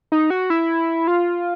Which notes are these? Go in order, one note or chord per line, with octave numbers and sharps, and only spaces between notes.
D#4
F#4
E4
F4